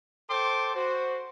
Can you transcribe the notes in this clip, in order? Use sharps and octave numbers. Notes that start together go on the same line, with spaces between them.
A4 C5 G5 C6 D6
F#4 C5